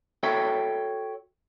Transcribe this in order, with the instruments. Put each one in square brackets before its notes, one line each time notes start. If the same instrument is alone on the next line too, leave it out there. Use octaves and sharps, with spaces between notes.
[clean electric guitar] F#4 A4 C#5 E5 G5